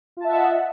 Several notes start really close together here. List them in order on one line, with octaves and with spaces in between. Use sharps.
F4 A5 E5 F#5 D#5